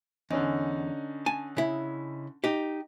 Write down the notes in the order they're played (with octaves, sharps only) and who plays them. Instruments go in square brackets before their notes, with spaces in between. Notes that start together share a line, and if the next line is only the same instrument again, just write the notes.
[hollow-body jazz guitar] E2 [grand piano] D3 C#4 D#4
[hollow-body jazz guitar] G#5 A5
C#3 E4
D#4 G4